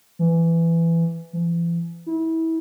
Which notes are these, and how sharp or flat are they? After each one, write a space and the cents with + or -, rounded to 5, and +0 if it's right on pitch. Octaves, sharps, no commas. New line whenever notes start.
E3 +15
E3 +45
E4 -25